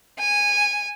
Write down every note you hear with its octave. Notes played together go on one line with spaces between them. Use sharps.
G#5